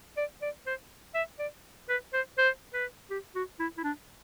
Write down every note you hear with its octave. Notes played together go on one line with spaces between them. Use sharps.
D5
D5
C5
E5
D5
B4
C5
C5
B4
G4
F#4
E4
E4
D4